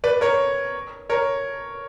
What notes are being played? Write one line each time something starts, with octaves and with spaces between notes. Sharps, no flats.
B4 D5
A#4 C#5
A#4 C#5